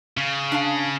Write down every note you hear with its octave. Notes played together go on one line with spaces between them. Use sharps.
C#3
D4 F5 A5